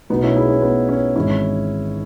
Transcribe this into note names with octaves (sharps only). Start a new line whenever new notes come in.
B1 B2 A3 B3 D#4
C#4 E4
E4 G#4
C#4
B3
C#4
G#1 G#2 E3 G#3 C#4 E4